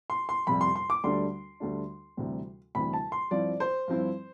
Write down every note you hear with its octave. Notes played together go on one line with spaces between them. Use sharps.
C6
C6
F2 C3 G3 B5
C6
C6
D6
D2 D3 G3 D4 C6
D2 D3 G3 D4
D2 C3 E3 G3
D2 C3 E3 G3 B5
A5
C6
G2 F3 C4 E4 D5
C5
G2 F3 C4 E4